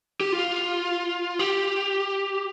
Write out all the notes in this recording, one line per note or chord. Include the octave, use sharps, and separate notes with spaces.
G4
F4
G4